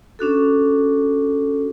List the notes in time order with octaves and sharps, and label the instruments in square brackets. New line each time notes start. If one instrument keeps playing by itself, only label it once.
[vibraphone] C#4 D4 F#4 A4